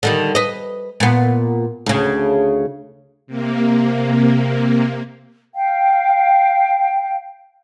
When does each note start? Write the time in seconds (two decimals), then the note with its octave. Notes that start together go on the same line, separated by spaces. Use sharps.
0.03 D3 D#3 G3
0.35 B4 D#5
1.00 A#2 B3
1.86 D2 C#3
3.27 C3 A#3
5.54 F5 G5